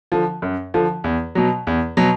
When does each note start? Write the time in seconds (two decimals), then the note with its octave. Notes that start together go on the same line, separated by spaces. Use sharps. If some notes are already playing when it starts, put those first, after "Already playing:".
0.12 D3 F3
0.42 F#2
0.74 D3 F3
1.04 E2
1.35 B2 F#3
1.67 E2
1.97 B2 F#3